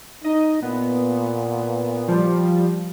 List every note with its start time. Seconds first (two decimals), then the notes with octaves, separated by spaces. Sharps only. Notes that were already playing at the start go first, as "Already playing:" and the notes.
0.24 D#4 D#5
0.63 A#2 B3
2.08 F3 G3